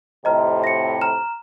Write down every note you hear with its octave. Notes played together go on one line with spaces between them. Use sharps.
F2 A2 C3 D#5 A#5 F6
A#6 C#7
A#5 F6 E7